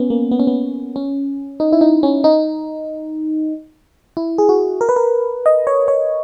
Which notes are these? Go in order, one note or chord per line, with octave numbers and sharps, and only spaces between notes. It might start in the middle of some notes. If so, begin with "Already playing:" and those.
Already playing: B3 C#4
A#3
B3
C#4
B3
C#4
D#4
E4
D#4
C#4
D#4
E4
G#4
F#4
A#4
B4
A#4
D#5
C#5
C#5